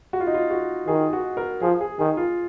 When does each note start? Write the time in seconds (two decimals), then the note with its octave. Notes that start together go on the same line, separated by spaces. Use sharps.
0.13 F#4
0.20 F4
0.27 D#4
0.34 F4
0.50 F#4
0.87 D#3 G#4
1.13 F#4
1.37 A#4
1.62 F3 G#4
1.81 G#4
1.99 D#3 G#4
2.17 F4